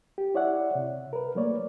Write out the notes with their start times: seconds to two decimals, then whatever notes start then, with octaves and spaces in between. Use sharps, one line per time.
0.18 G4
0.35 E4 C#5 D5 E5 F#5
0.75 C3
1.13 A#4 B4
1.35 F#3 A3 A#3 C#5 D5